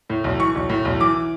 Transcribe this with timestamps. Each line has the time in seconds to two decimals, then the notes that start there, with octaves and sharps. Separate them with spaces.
0.10 A2
0.24 B1
0.40 E3 C#6
0.55 B1
0.69 A2
0.85 B1
1.00 E3 D6